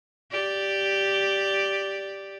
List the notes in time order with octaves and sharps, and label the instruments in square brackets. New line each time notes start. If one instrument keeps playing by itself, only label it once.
[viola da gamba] G4 D5